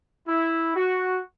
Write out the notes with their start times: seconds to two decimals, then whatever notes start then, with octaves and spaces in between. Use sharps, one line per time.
0.28 E4
0.76 F#4